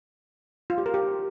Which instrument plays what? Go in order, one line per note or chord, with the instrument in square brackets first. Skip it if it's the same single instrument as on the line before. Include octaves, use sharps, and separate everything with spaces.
[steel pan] F4
G4
A#4
G4